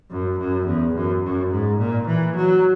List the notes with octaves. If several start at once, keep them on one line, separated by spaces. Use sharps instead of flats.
F#2
F#2
E2
F#2
F#2
G#2
A#2
E3
F#3